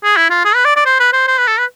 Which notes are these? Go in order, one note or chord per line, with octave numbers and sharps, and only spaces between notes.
G#4
E4
F4
G#4
B4
D5
D5
C5
B4
C5
C5
B4
A4
B4